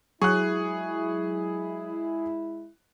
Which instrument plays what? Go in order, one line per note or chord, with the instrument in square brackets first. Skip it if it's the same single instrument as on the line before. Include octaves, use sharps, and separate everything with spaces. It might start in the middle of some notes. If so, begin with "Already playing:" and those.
[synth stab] F#3 [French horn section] G#3 E4 [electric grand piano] G#4 [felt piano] C#6 F#6